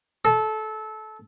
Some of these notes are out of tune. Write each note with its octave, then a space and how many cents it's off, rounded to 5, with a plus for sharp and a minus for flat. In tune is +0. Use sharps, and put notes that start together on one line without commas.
A4 -20